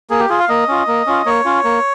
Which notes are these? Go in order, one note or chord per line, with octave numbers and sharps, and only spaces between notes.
A#3 G#4
G4
F4 G#4
F5
A#3 D#5
C#4 F4
A#3
C#4 F4
A#3 C#5
C#4 F4
A#3